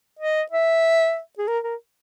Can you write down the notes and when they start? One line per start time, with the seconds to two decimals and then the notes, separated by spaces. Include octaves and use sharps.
0.19 D#5
0.51 E5
1.38 G#4
1.48 A#4
1.64 A#4